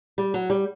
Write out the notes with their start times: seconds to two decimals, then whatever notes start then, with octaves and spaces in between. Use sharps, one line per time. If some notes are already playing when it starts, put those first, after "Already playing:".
0.18 G3
0.34 F#3
0.50 G3